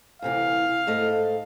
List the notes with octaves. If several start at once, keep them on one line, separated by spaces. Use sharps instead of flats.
D2 C3 E3 F5
G#2 A3 D#5